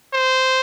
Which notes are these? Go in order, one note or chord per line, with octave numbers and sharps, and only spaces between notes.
C5